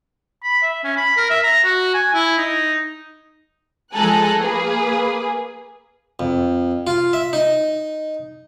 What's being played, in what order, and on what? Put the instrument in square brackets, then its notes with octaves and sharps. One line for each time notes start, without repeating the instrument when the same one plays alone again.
[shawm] B5
E5
C#4
B5
A#4
E5
A#5
F#4
G#5
E4
D#4
[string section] F3 G#3 A4 G#5 A#5 F#6
A#3 G#4 B4
[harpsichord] F2
F4
E5
D#4